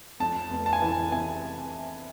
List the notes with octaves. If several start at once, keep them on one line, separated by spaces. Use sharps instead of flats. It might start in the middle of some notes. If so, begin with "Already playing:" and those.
F2 A5
F1
A5
G#5
E3 A5
C3 G#5